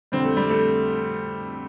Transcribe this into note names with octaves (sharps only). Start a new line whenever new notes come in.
F2 D3 G3 C4
A3
G3
A3